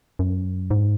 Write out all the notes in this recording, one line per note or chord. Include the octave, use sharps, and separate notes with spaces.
F#2
G#2